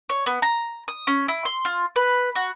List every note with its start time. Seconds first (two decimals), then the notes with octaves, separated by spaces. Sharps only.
0.09 C#5
0.26 B3
0.42 A#5
0.88 D#6
1.07 C#4
1.28 E4
1.45 C6
1.65 F4
1.96 B4
2.35 F#4